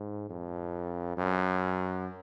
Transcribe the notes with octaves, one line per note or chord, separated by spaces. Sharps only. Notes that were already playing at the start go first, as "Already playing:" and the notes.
Already playing: G#2
F2
F#2